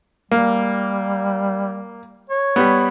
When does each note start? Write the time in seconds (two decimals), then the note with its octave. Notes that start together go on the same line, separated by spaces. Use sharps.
0.32 G3 A#3
2.30 C#5
2.56 G3 B3